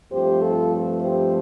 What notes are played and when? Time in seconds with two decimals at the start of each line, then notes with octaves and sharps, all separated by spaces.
0.12 G2 F3 A3 C4 G4 C5
0.41 F4 A4
1.01 G4 C5